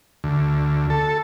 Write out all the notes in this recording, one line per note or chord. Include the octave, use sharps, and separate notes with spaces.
D2
A4